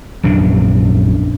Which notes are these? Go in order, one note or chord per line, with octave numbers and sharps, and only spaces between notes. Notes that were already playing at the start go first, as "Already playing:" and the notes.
A#1 F#2 C3 D4